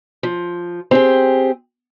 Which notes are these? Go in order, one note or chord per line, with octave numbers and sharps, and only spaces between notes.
F3
C4 G4 G#4